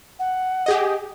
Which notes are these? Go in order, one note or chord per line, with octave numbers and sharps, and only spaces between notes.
F#5
G4 G#4 D#5